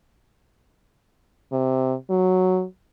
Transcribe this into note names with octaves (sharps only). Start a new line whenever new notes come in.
C3
F#3